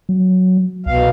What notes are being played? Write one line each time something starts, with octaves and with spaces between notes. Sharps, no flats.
F#3
C2 B2 F5